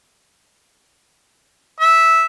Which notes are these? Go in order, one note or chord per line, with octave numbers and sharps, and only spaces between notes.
E5